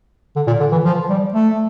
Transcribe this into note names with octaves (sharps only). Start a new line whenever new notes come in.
D3
A#2
D3
E3
F3
G3
A3